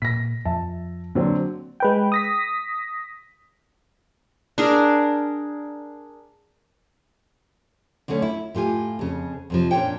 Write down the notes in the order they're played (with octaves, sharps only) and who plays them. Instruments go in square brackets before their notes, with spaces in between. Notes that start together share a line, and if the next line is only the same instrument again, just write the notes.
[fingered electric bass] A#2 [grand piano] A#6 B6
[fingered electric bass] F2 [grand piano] E5 A5
[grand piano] D3 F#3 C4 [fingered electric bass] A#3
[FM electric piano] G#3 B4 G5
D#6 A#6 B6
[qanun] D4 G#4 A#4
[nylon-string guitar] D3 F#3 A3 C#4
E4
A2 F4 G4 G#5
F2 C#3
F2 C3 F3
A#2 C#4 D4 G4 C#5 G5